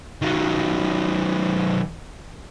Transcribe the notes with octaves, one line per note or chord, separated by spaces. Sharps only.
D#3 F#3